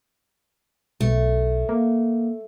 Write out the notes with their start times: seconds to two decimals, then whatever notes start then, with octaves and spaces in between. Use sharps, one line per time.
1.01 B1 A3
1.69 A#3